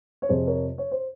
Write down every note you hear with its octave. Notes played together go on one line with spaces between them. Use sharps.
C#5
F2 C3 F3 G#4 C5
A#4 C#5
C#5
C5